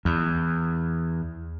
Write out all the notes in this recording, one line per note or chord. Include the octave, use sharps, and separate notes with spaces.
E2